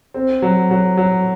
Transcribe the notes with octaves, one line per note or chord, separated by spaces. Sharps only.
C4
F#3
F#3
F#3